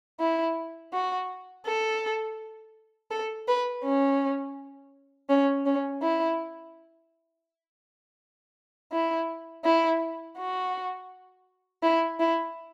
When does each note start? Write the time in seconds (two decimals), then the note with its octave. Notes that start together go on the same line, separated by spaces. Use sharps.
0.20 E4
0.93 F#4
1.66 A4
3.11 A4
3.48 B4
3.84 C#4
5.29 C#4
5.66 C#4
6.02 E4
8.92 E4
9.65 E4
10.37 F#4
11.83 E4
12.20 E4